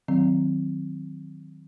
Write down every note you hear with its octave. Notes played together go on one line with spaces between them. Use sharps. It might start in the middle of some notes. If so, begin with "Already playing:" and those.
D#3 F#3 C4